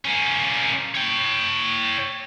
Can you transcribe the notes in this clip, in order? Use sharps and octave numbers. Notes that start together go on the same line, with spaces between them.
A#3 C#4
C#5 G5